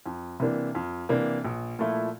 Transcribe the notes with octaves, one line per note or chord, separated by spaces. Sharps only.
F2
C3 E3 A#3 D4
F2
C3 E3 A#3 D4
A#1
A#2 F3 A3 E4